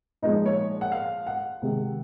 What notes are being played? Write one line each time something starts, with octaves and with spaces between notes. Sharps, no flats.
A#2 F3 G#3 D#4
C#5
F#5
F5
F#5
C3 D#3 G#3